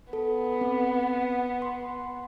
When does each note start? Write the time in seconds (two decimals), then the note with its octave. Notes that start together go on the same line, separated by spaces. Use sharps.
0.13 B3 A4
0.61 C4
1.62 C6